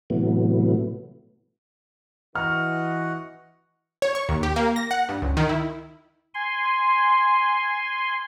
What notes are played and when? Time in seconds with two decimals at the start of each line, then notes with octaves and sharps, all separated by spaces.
0.10 A2 C3 E3 F#3 A3 B3
2.35 E3 F#4 D#5 F#5 F6
4.02 C#5
4.15 C#6
4.29 D#2
4.43 G4
4.56 A#3
4.76 A#6
4.91 F#5
5.09 G2
5.22 C#2
5.37 D#3
5.49 E4
6.34 G#5 C6